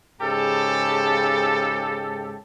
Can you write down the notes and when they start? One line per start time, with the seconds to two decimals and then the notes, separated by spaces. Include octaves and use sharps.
0.21 G#2 C#3 G4 A4 A5